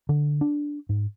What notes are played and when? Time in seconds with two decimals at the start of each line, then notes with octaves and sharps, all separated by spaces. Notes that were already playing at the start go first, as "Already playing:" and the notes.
0.09 D3
0.41 D4
0.89 G#2